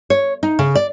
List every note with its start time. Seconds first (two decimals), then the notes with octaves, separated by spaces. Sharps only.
0.10 C#5
0.43 D#4
0.59 C#3
0.75 D5